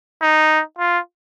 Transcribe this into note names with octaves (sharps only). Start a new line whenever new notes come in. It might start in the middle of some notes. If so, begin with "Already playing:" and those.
D#4
F4